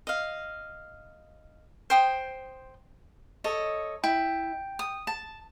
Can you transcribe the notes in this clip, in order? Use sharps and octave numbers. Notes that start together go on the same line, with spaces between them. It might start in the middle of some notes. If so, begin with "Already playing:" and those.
D#5 F5
C5 G5 D#6
A4 C#5 D#5
E4 G5
D#6
A5